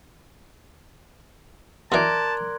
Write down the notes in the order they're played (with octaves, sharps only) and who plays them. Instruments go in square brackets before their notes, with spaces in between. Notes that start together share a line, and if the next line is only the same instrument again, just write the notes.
[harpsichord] B2 E3 [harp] A#4 D5 [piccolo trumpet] A5 [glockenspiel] C6 F#6 G#6